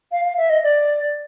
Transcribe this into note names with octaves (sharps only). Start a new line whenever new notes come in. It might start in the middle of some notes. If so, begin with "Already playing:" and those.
F5
F5
E5
D#5
D5